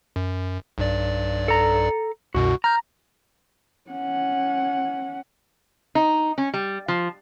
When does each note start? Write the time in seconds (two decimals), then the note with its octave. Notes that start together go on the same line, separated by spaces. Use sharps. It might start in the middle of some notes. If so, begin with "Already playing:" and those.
0.16 F#2
0.78 B1 G2 D5
1.48 A4 A#5
2.35 C2 F#2 B2 F#4
2.64 A#5 F6 G6
3.90 C#4 F#5
5.95 D#4
6.38 C#4
6.54 G3
6.88 F3